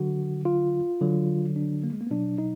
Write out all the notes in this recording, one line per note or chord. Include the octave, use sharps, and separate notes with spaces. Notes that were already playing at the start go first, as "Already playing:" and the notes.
Already playing: D3 F#3 F#4
F4
D3 F#3
D4
A#3
G#3
A#3
B3
B2 F#3 D4
D#4